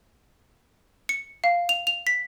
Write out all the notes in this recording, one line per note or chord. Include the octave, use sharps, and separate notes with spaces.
C#7
F5
F7
F7
B6